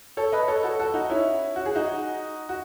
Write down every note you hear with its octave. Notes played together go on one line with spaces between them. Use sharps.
A4 C#5
B4 D#5
A4 C#5
F#4 A4
F#4 A4
D#4 F#4
C#4 E4
F#4
G#4
D#4 F#4
F#4